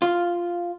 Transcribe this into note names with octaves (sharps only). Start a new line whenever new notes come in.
F4